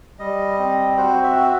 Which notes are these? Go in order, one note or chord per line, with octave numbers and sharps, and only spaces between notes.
G3 D#5
C4
F#4 C5
E5
F#4